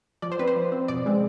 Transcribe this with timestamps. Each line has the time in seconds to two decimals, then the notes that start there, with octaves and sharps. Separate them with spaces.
0.22 F3 D5
0.32 C5
0.39 C4 B4
0.48 C5
0.56 F3
0.72 C4
0.88 B2 D5
1.06 G#3 C4